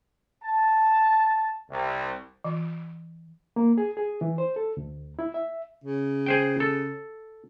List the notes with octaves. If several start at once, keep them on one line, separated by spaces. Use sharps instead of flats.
A5
C2
E3
A#3
G#4
G#4
E3
C5
A4
D2
E4
E5
C#3
G#4 C5 G5
A4